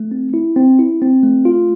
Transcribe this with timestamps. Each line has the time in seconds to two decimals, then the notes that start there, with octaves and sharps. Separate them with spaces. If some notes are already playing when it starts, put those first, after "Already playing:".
Already playing: A3
0.11 C4
0.34 E4
0.56 C4
0.79 E4
1.01 C4
1.23 A3
1.45 F4